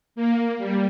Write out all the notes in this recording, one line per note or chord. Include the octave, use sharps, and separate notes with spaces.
A#3
G3